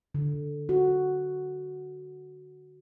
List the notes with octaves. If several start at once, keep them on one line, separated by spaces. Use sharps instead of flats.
D3
F#4